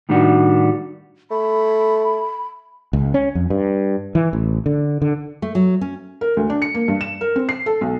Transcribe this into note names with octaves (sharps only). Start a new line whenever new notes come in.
A2 D#3 G3 D4 F#4
A3 B5
C#2
C#4
F2
G2
E3
A1
D3
D3
A3
F#3
C#4
A#4
D2
D4
C#7
A#3
G2
E7
A#4
C4
C7
A4
B1